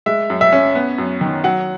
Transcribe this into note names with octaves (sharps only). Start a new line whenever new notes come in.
G#3 E5
F#2
E5
C#4
B3
F#2
D#3
F#3 F#5